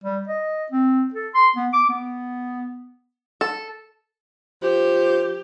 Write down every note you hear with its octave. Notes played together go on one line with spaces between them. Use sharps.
G3
D#5
C4
A4
C6
B3
D6
B3
A4
F3 G4